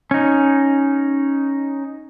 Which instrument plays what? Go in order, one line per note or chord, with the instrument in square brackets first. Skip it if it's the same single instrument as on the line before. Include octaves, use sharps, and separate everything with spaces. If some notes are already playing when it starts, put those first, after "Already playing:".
[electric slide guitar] C#4 D#4